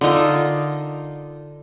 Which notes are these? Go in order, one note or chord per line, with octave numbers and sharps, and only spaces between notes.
D3 D#4 F4 A#4